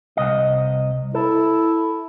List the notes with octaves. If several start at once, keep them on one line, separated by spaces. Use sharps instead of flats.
C2 D#5
E4 A4